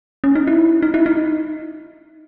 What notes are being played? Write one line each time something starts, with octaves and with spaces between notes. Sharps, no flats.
C#4
D#4
E4
D#4
E4
D#4